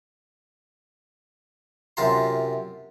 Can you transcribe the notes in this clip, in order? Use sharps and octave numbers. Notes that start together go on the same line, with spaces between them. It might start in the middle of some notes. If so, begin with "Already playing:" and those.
F#2 C3 F4 A5 A#5 C6